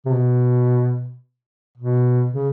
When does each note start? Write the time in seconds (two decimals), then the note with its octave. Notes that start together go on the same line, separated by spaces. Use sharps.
0.05 C3
0.12 B2
1.78 B2
2.33 C#3